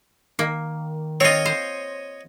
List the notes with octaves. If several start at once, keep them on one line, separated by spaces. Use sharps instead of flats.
D#3 A#3
C4 F4 C#5 D#5
C5